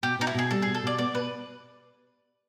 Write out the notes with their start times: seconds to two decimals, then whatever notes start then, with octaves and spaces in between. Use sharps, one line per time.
0.03 B2 G4
0.19 B2 D#4
0.27 E4
0.34 B2 G#4
0.51 G3 A4
0.62 B2 G#4
0.75 A4
0.83 B2 D5
0.99 B3 D5
1.14 B2 B4